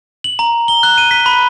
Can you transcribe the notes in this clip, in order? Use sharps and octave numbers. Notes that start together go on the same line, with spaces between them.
F#7
A#5
G7
F#6
D#7
B6
B5